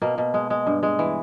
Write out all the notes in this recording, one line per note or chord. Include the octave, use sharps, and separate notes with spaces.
B2 A#3
B2
G#3
G#3
G2
G#3
E3